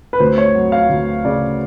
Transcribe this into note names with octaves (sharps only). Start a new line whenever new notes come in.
B4
D2 C5
C#5
F#3
F5
D2
C#3 D5